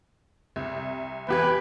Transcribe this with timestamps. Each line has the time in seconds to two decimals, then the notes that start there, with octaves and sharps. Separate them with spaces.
0.56 C2 C3
1.29 E2 G4 B4 G#6